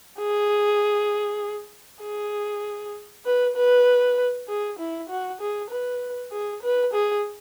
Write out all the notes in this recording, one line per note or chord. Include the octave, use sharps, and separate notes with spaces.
G#4
G#4
B4
B4
G#4
E4
F#4
G#4
B4
G#4
B4
G#4